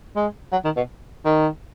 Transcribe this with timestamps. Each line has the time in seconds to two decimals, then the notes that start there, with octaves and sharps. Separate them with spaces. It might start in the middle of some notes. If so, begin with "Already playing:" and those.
0.16 G#3
0.52 F#3
0.65 D#3
0.76 B2
1.25 D#3